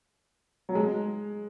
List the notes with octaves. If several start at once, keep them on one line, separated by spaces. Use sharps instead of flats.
F#3
G#3